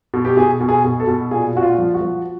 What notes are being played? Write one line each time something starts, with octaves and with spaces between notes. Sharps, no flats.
B2
G4
B2 G#4
B2
G#4
B2
A4
B2
A#2 G#4
A#2 F#4
F4
F3
F#4
F3